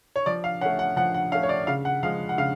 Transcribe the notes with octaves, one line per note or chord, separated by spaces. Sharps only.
C#5
F3 D5
F5
A3 C#4 F#5
F#5
F3 F#5
F#5
A3 C#4 F5
C#5
D5
C#3 F5
F#5
F3 G#3 F5
F#5
C#3 F5